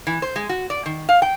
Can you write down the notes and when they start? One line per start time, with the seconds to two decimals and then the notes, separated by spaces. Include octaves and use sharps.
0.07 E3
0.22 C5
0.36 G#3
0.49 F#4
0.70 D5
0.86 D#3
1.09 F5
1.22 G5